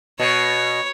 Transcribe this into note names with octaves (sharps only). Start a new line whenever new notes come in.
B2 C#5